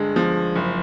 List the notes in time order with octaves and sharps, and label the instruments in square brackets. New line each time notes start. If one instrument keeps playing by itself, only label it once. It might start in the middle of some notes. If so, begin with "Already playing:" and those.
Already playing: [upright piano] G2 D3 G#3
F3
F#1